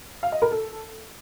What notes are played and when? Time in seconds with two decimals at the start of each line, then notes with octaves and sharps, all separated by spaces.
0.23 F5
0.32 D#5
0.42 A#4
0.51 A4